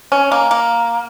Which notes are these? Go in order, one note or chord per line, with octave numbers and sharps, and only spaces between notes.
C#4
A#3
A#3